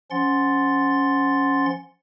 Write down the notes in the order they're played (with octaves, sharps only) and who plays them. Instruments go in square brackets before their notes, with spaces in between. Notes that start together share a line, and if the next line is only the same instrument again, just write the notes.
[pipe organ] F3 C#4 F#5 C6 A6